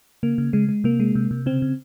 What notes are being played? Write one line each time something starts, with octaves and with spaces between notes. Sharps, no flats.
C#3 A#3
C#3
C#3 G#3
G#3
C3 A#3
G#3
C3
C3
C#3 C4
C#3